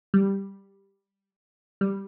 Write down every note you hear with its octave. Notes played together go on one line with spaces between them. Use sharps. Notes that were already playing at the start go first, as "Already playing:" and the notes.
G3
G3